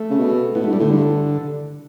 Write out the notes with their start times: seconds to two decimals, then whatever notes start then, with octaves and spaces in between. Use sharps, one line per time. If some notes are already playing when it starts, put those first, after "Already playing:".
Already playing: A3
0.10 C#3
0.19 B2
0.55 A2 B3
0.64 A3
0.67 G2
0.73 G3
0.79 A2 D3
0.91 G2